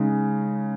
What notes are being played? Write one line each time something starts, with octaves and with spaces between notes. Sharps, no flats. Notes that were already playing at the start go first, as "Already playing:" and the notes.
Already playing: C#3 G#3 D#4